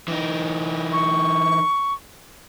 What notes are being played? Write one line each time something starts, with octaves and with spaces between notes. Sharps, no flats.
E3 D#4
C#6